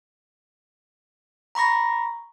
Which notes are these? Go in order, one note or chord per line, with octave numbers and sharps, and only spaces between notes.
A#5 B5 C#6 A#6